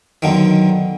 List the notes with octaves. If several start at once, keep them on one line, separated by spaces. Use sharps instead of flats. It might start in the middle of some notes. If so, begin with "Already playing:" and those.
B1 D3 D#3